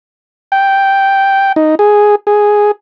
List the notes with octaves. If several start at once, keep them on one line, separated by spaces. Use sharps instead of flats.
G5
D#4
G#4
G#4